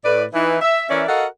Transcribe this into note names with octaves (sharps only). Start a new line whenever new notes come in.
A2 B4 D5
E3 D#4
E5
E3 C#4 A#4 D5 E5
F#4 A4 A#4 D#5 F5 F#5